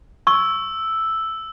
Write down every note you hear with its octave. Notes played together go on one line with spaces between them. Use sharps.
C#6 E6